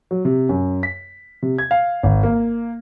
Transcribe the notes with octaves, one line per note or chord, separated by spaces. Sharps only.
F#3
C3
F#2
B6
C3
G#6
F5
G#1
A#3